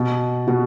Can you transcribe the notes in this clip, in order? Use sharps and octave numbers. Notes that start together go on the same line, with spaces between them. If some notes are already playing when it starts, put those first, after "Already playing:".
Already playing: B2
B2 F#4